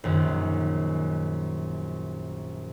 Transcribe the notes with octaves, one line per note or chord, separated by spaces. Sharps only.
A#1 F#2 D#3